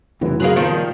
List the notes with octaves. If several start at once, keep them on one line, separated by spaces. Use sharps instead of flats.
F1 C#3 E3 F#3
F#2 C#3 F#3 A#3 C4 F#4 G#4 B4
A#2 D#3 F3 B3 D#4
G3